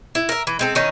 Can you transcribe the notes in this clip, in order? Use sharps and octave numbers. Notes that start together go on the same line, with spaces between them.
E4
A#4 E5
E3
G#3 C4 A4
D#3 E3 C#4 D#4